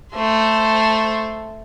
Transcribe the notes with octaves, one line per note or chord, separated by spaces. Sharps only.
A3 C5